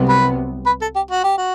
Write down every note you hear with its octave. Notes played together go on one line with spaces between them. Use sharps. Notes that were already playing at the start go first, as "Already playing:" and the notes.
Already playing: C2 C3 F#3 B3
B4
B4
A4
G4
F#4
G4
F#4